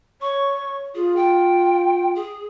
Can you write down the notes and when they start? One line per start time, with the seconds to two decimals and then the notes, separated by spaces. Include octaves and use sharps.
0.21 C#5 C#6
0.95 F4 G#4
1.16 G5
2.15 G#4